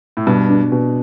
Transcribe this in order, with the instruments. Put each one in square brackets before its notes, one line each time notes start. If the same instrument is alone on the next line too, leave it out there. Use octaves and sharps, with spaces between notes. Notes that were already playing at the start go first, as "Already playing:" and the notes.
[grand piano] A2
[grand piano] G2 [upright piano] B2
[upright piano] D4
B2